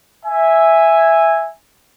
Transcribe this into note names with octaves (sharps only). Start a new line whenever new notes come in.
E5 G#5